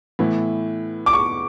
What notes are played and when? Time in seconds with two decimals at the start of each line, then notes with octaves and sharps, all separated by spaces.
0.19 A2 E3 B3 E4
1.06 D6
1.13 C#6